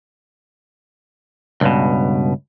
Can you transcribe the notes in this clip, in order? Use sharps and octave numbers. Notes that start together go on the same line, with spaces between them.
C#2 G2 B2